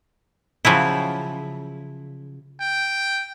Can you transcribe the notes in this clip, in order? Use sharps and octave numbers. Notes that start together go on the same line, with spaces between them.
C#3 F3 F#3 E4
G5